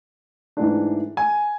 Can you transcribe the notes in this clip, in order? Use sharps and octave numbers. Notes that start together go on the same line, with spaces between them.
G#2 E3 A3 D4
G#5